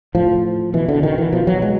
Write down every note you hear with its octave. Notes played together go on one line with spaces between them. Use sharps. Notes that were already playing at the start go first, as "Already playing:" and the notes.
A2 F3
B2 E3
D3
D#3
E3
B2 F3
F#3
G#3